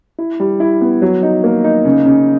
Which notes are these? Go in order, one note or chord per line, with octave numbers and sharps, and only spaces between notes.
E4
G3
E4
B3
F#3
D#4
A#3
D#4
C#3
C#3